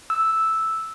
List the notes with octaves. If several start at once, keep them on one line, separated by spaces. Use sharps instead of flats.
E6